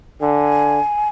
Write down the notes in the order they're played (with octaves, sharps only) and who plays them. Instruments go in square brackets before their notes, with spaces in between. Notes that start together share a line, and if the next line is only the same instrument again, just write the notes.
[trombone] D3 [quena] G#5